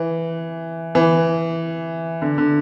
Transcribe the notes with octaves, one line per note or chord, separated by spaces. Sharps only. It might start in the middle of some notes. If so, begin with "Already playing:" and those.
Already playing: E3
E3
D3
D3